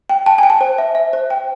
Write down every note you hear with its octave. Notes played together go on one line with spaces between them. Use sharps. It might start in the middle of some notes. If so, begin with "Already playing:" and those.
G5
G5 A5
G5 G#5
A5
C5
E5
E5
C5
G5